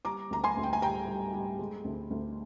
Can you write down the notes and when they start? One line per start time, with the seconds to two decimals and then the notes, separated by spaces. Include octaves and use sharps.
0.05 G3 A#5 D6
0.30 D2 A#5
0.44 G#5 C6
0.57 D2
0.63 G5
0.73 G#5
0.82 G3 G5 A#5
1.07 G3
1.33 G3
1.59 G#3
1.85 D2
2.10 D2